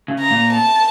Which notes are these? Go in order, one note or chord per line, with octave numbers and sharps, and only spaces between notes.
C#3
A#5
A#2
A5